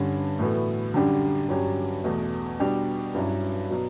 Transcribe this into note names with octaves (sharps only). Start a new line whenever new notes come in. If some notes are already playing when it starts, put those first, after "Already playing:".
Already playing: G2 D3 G3 C#4
A2 E3 B3 F#4 A4
F#2 D3 G3 D4 G4
G2 F#3 C#4 G4
E2 B2 A3
B2 G3 D4 G4
G2 F#3 C#4 E4
B2 F#3